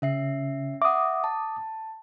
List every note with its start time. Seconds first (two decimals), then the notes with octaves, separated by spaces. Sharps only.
0.02 C#3 C#4 E5 C7
0.82 E5 F#5 D6 D#6
1.24 A5